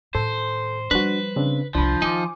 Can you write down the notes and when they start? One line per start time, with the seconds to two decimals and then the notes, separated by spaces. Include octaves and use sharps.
0.15 A2 D#3 A4 C5
0.91 F3 G3 D4 F#4 B4
1.36 C#3 C4 D4
1.75 C2 F3 D4 F4 B5
2.02 D#3 D#4 G#5 D6